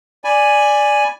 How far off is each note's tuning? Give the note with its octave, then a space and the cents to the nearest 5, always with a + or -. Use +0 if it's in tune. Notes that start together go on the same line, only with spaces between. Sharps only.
D5 +0 G#5 +0 B5 +0